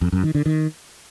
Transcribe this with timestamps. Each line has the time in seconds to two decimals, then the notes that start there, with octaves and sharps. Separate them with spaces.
0.01 F2
0.12 F#2
0.23 D#3
0.35 D3
0.46 D#3